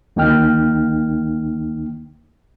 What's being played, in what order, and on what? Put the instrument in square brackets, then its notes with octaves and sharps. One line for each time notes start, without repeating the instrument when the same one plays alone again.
[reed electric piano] D2 D#3 A#3 D#4 G5 F6